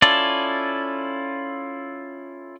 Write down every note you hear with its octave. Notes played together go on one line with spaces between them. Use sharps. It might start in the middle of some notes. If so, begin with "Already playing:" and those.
C#4 E4 F4 A4 D5